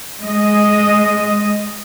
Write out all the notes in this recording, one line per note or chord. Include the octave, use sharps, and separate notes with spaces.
G#3 D#5